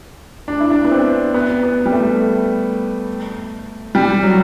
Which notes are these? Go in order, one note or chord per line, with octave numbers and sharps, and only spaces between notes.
D4
E4
D4
B3
C4
B3
B3
G3
A3
G3
F#3